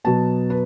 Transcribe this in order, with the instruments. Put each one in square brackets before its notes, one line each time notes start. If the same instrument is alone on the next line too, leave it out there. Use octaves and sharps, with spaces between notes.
[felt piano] B2 F#3 B3 A5
B4